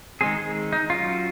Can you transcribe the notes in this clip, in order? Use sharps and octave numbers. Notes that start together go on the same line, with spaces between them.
D#3 G#3 C4 G#4
G#4
D#4
F#3 C#4 F4